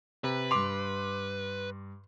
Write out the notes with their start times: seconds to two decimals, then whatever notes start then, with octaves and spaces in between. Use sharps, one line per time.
0.24 C3 B4
0.51 G2 C6 D6 F7